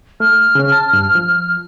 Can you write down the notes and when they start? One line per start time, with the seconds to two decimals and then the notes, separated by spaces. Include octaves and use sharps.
0.20 A3 F6
0.55 C#3 C#4
0.72 A5
0.93 G2
1.15 F3